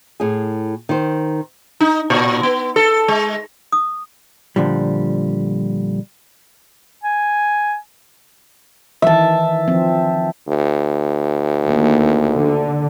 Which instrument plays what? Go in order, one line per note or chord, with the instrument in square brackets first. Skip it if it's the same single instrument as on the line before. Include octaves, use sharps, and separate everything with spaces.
[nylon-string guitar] A2 G#4
D#3 C5
[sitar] D#4
A#2
B3
A4
G#3
[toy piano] D#6
[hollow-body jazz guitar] A#2 D3 F3 G3
[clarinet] G#5
[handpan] D#3 E3 [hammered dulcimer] E5 A5
[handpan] F3 C4
[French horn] D2
[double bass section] D#2
D3